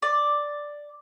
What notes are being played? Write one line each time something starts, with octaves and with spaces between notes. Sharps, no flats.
D5